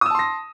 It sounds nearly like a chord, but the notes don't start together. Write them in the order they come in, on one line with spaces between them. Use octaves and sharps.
D#6 E6 A5 C6 A#6